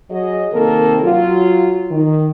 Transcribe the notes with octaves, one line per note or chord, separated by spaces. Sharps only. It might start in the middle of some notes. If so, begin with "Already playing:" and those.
F#3 G#4 D#5
C3 D#3 A#3 C4 A4 A#4
F#3 F4
D#3